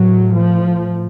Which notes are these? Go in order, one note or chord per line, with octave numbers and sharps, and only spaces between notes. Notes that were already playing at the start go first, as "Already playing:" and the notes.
Already playing: A2 F#3
F3